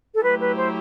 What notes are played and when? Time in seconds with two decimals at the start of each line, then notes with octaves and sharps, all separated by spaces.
0.14 A4
0.23 F#3 A3 E4 G4 B4
0.40 B4
0.56 C5